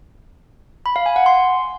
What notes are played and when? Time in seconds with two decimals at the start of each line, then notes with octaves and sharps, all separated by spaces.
0.86 B5
0.96 F5
1.06 G#5
1.16 F#5
1.26 C6